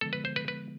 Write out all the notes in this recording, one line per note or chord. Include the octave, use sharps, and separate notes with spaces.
D3 F3 G#3 B3 A4
B4
C5
B4
B4